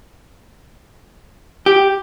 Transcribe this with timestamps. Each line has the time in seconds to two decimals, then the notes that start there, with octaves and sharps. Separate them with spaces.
1.66 G4